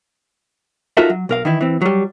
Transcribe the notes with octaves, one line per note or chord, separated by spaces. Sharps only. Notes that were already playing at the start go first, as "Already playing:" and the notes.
D#4 F4 F#4 A4 A#4 E5
F#3
B1 A#4 F5
D#3 E3 E4
E3 C4
F#3 G3